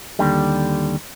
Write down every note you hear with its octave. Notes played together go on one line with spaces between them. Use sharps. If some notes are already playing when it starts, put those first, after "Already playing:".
D#2 D3 G3